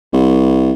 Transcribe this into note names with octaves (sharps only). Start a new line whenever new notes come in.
C2